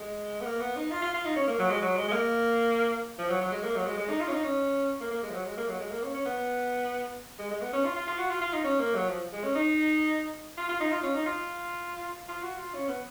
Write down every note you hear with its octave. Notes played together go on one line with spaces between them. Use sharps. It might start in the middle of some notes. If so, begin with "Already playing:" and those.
Already playing: G#3
B3
A#3
B3
D#4
F4
F4
F4
D#4
C#4
A#3
F#3
G#3
F#3
G#3
G#3
A#3
F3
F#3
F#3
G#3
A#3
F#3
G#3
G#3
D#4
F4
C#4
D#4
C#4
A#3
A#3
G#3
F3
F#3
G#3
A#3
F#3
G#3
A#3
C#4
C#4
B3
G#3
G#3
B3
C#4
F4
F4
F4
F#4
F4
F4
D#4
C#4
A#3
F#3
F3
G#3
C#4
D#4
F4
F4
D#4
F4
C#4
D#4
F4
F4
F#4
F4
C#4
B3